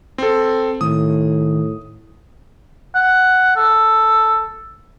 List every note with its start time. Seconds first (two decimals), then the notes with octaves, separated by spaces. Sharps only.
0.18 C4 A4
0.81 A2 D#3 D#6
2.95 F#5
3.56 A4